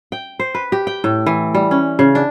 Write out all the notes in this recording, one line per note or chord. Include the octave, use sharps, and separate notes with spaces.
G5
C5
B4
G4
G5
A2
E3
G3
C#4
C#3
D4